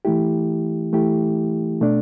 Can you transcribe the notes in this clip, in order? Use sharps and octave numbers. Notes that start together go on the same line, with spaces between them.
E3 A3 E4 G4
E3 A3 E4 G4
B2 A3 D4